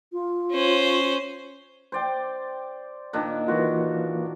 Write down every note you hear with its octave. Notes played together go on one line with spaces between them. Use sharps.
F4
C#4 C5
C5 D5 G5
A#2 D#3 D4
E3 A#3 F4 F#4